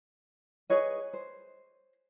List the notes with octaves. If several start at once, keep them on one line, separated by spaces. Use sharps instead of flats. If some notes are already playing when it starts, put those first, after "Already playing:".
G#4 B4 C#5 D#5
C5